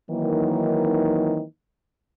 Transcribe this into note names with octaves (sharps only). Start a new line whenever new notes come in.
D#3 E3 F#3 A#3 C4 D#4